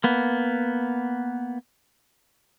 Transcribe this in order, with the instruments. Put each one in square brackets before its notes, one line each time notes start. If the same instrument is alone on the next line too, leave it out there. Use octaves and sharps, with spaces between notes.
[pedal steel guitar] A#3 B3